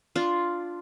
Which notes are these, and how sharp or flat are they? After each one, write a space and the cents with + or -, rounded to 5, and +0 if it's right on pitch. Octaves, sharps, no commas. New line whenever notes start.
D4 +0 F4 +0